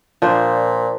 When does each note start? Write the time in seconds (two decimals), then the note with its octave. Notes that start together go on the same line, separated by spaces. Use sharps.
0.22 A#2 F3 D4 C5